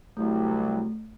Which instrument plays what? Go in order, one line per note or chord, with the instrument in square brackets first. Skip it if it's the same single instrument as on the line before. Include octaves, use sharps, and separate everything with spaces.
[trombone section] C2 F#3 [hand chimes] A3